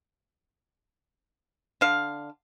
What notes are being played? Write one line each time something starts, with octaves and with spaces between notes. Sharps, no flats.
D3 F5